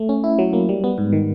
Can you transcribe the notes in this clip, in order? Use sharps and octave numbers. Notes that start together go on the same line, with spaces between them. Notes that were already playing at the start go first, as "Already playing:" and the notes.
Already playing: A3
C#4
E4
F#3
A#3
G3
B3
G#2
D#3